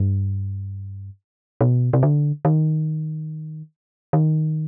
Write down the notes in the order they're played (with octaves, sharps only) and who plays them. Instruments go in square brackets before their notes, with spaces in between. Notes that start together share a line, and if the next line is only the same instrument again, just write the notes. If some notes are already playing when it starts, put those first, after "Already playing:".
Already playing: [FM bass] G2
B2
C3
D3
D#3
D#3